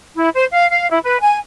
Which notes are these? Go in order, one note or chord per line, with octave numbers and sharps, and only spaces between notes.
E4
C5
F5
F5
E4
B4
G#5